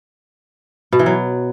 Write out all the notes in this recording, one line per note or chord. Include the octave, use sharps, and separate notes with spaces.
B2
E3
F#3